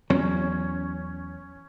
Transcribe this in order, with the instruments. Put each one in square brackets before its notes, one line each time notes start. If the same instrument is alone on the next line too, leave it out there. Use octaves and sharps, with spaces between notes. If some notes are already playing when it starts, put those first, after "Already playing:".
[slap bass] E2 F#3 [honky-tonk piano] C#4